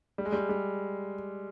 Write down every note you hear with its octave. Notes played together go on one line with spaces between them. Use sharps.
G3
G#3
G3
G3